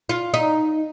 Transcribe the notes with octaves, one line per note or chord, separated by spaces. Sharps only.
F4
D#4